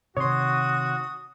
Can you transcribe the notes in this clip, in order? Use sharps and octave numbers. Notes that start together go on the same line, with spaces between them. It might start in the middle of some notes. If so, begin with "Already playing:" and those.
C3 D#3 F#4 C#5 C6 D#6